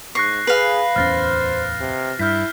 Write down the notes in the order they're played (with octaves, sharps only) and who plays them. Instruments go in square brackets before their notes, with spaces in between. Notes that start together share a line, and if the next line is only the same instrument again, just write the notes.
[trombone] G#2 [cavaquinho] C#6 [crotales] F#6 A#6 C7
[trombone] G#4 [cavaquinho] B4 F5
[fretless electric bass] D1 E2 C#4 [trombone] C5 [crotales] F6 A6 A#6
[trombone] C3
[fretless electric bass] G2 [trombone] E4 [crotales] F6 G6 B6